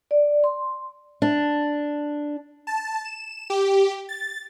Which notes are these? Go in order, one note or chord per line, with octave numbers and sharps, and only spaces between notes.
D5
C6
D4
A5
E7
G4
A6